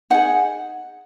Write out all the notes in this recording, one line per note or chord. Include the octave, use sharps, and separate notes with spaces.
D#4 G#4 F#5